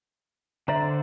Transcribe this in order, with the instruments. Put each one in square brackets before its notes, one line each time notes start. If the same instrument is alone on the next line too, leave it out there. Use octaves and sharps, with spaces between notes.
[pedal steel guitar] D3 C5 D5 [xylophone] E5 A#5